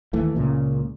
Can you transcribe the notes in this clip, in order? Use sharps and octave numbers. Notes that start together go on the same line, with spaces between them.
D#2 E3 A3
C#2 A#2 C#3